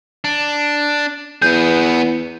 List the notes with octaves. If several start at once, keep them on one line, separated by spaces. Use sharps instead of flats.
D4
E2 B3 G#4 G6